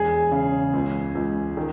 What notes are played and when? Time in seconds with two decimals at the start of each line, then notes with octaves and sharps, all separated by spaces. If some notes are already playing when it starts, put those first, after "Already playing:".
Already playing: E1 G#4
0.32 C#3
0.73 C#2
1.15 C#2
1.57 D#3